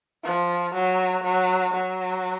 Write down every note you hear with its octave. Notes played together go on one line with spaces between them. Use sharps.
F3
F#3
F#3
F#3